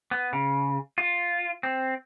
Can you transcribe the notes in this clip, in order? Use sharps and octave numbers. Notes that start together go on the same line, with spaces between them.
B3
C#3
F4
C4